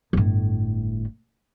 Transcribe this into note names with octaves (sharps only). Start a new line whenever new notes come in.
G1 A2